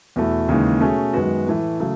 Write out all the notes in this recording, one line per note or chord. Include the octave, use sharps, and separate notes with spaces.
E2 B2 A3 E4
D#2 C#3 E3 G#3 D#4
B2 A3 C#4 G#4
F#2 D#3 G#3 B3 F#4
A2 E3 A3
C#3 F#3 A3